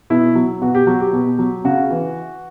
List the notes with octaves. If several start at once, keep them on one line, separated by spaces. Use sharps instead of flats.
B2 E4
F#3
B2 F#4
G4
F#3 F#4
G4
B2
F#3
C#3 F#4
E3